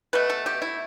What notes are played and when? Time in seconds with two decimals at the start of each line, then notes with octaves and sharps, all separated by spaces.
0.13 B2 A3 B4
0.30 A4
0.46 G4
0.62 E4